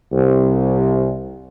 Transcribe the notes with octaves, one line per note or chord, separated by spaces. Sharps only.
C2